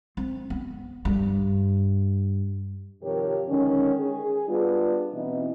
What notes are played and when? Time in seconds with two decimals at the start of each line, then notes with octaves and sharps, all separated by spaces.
0.17 C4
0.50 B3
1.05 G2
3.02 C3 D#3 F3 G4 A#4 C#5
3.48 D3 D#3 G#3 C#4
4.00 G#4
4.48 G3 B3 D4 F4
5.12 B2 E3 C4 D#4 E4